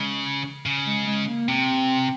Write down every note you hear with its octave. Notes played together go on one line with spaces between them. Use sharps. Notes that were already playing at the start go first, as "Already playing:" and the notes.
Already playing: C#3 G#3
C#3
G#3
G#3
A#3
C3 C4